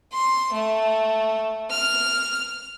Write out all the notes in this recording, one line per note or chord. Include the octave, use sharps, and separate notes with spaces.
C6
A3
F6